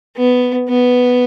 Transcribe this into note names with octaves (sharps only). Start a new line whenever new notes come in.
B3
B3